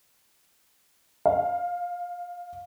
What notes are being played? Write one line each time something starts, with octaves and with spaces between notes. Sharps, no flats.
F5